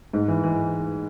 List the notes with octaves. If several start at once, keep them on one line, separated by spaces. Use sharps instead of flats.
G#2
E3
E3